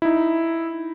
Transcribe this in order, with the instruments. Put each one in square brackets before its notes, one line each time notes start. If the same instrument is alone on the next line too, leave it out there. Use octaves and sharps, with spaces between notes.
[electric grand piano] D#4 E4